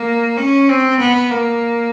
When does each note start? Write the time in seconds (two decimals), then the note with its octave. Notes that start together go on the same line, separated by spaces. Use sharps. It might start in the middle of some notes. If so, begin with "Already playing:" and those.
Already playing: A#3
0.37 C#4
0.69 C4
1.00 B3
1.30 A#3